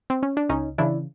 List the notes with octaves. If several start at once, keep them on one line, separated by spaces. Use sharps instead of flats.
C4
C#4
D4
C#2 C#4 D#4
C#3 E3 D4 E4